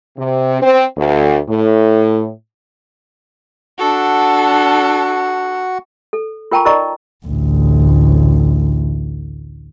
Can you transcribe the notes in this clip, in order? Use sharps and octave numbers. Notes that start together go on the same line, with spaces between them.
C3
C4
D2
A2
D4 F#4 A4 F#5
A4
F4 A#4 G5 A5 A#5 C#6
D#4 A#4 D5 D#5 A#5 C#6
A1 D2